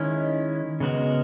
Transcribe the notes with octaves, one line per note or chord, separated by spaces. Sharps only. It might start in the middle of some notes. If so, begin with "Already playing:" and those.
Already playing: D#3 G#3 C#4 E4
C#3 G#3 B3 F#4 A#4